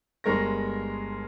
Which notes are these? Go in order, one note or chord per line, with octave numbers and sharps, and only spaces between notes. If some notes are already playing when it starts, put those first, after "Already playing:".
G1 G2 G#3 A#4 C#6 A#6